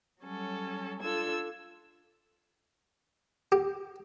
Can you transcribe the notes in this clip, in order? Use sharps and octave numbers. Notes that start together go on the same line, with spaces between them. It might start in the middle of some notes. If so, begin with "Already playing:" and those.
F#3 G3 C#4 A4
D4 F4 A4 E6 G#6
G4